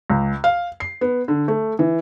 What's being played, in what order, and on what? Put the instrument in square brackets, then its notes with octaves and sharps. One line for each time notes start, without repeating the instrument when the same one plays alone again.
[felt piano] C#2
F5
C7
B3
D3
A3
E3